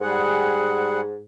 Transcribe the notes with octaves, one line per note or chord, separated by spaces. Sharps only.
G#2 G3 G#4 F#5